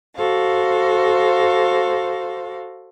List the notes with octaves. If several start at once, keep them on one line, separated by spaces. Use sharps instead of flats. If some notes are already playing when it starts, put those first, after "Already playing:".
F#4 A4 C5 F5